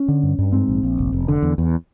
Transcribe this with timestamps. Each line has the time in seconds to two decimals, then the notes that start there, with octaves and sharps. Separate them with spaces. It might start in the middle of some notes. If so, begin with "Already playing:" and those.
Already playing: C#4
0.08 D3
0.23 G2
0.39 G2
0.52 G#2 C4
0.68 A#1
0.83 A#1
0.98 F1
1.13 F1
1.28 D3
1.43 E2
1.58 E2